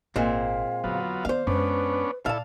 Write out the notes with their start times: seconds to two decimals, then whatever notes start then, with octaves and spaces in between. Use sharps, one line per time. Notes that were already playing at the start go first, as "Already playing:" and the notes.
0.16 G#1 A#2 G#3 C4 F5
0.84 F2 D3 F#3 B3 F4
1.25 D#3 B3 C5 D5 F5
1.47 F#2 G#3 B3 C#4 D4 B4
2.26 A#2 E4 A4 D5 F5 A5